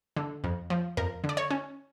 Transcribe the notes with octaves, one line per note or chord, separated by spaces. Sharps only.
D3
F2
F3
F2 A#4
D3
D5
C#5
C#4